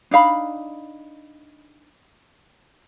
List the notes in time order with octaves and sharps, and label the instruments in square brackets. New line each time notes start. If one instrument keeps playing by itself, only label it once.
[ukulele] D4 D#4 F5 B5